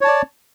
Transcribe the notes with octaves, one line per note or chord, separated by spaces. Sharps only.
C#5 D5 A5